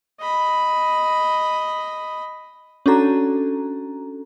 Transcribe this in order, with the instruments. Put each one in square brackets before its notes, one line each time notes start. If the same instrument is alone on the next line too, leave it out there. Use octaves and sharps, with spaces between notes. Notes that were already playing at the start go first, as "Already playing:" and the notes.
[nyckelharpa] D#5 B5
[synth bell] C#4 D4 F#4 A4 A#5